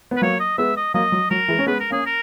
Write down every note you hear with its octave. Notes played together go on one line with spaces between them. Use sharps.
B3
B4
F#3 A#3 C#5
D#5
G#3 B3 E5
D#5
F#3 A#3 D#5
F#3
F#3 A#4
E3 G#3
C#4
G#3 B3 B4
A#4
A#3 C#4 G#4
A#4